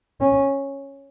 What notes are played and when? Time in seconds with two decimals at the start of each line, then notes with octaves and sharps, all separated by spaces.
0.21 C#4